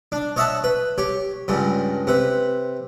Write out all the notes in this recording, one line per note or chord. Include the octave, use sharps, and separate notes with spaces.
D4
C#5 D#5 E5 F#5 A5
B4
G4 C#5
C#2 G2 C#3
C3 B4